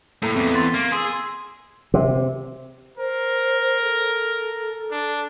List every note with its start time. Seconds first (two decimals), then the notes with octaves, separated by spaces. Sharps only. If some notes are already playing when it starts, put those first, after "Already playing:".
0.22 A2 A#3 A4 A#5
0.36 E2 C4
0.55 C6 A6 B6
0.74 A#3
0.92 G#4 C6 E6
1.94 C3
2.97 A#4 C5
3.82 A4
4.91 D4